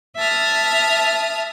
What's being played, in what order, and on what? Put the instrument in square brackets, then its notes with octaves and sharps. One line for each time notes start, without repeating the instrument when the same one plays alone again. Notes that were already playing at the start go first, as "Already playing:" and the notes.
[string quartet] E5 A5 D#6 F6